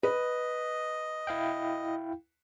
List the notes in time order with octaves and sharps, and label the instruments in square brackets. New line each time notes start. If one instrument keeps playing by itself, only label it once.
[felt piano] B4 [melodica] D#5
[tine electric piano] E4 F5 G5